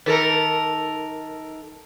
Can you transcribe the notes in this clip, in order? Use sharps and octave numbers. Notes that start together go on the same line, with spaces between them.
D#3 A4 A#4